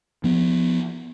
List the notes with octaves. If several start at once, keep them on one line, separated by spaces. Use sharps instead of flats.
F3 B3